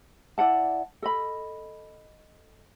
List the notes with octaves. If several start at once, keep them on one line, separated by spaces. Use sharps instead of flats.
E4 D5 F#5 A5
A4 D#5 B5